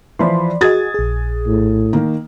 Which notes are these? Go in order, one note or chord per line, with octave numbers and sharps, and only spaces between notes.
E3 F3 D5 B5 C6
F#4 G#4 D#5 D#6 G#6 A6
A#1 G#4
A2
D#3 A#3